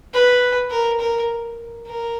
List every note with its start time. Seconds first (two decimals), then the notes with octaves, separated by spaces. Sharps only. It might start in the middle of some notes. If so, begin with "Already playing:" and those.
0.14 B4
0.71 A#4
1.00 A#4
1.87 A#4